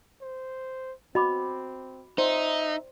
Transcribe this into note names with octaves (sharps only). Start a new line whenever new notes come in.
C5
C4 F#4 D#5 B5 D6
D#4 C5 D5 E5